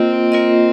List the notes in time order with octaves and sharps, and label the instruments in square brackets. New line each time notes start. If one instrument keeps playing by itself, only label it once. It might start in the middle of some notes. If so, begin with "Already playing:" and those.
Already playing: [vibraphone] A#3 F4 A#4 D#5 [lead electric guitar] C4
[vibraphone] A#3 F4 A#4 D#5